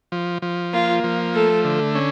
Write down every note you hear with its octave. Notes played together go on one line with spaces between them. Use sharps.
F3
F3
A#3 F4
F3
A3 A4
D3
C#4